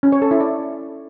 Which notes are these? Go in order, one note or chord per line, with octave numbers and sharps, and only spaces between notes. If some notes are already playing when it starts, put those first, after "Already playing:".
C#4
C#5
A4
E4
D5